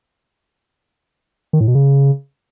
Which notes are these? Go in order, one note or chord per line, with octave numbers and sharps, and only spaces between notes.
D#3
A2
B2
C#3